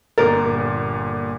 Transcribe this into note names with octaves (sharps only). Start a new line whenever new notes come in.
G1 A#2 A#4 A6